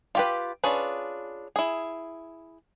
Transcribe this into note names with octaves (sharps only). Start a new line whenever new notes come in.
F4 G4 B4
C#4 D4 F4 G#4 B4
E4 G#4